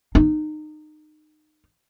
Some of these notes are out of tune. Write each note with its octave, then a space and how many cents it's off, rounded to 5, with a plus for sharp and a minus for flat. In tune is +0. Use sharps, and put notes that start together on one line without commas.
D#4 -25